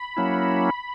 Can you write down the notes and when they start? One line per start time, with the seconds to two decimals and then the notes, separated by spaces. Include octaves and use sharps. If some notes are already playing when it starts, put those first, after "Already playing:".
Already playing: B5
0.17 F#3 A#3 C#4 E4